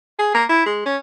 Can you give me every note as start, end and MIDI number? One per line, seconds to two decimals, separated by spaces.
0.19 0.33 68
0.34 0.44 58
0.49 0.66 64
0.66 0.82 56
0.86 0.97 61